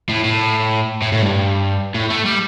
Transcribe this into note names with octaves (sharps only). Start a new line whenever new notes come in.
A2
A2
A2
A2
G2
A2
A3
G3